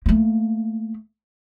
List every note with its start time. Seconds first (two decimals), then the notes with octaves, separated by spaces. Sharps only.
0.06 A3 A#3